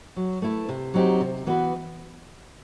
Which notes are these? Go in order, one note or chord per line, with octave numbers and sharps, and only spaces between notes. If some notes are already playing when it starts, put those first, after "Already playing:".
F#3
A3 E4 B4
C3
F#3 C4 D#4 G4
C3
E3 B3 F#4 B4